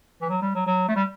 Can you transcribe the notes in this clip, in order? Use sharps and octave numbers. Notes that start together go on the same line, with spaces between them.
E3
F#3
G3
F#3
F#3
A3
G3